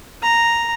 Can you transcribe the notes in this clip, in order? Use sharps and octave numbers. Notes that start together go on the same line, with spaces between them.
A#5